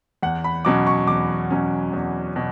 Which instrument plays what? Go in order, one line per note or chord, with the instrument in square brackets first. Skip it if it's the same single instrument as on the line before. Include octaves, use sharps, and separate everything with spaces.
[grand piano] E2 F#5
B5
B2 F#3 C#4 D6
C#6
E2 D6
B2 F#3 C#4
E2
B2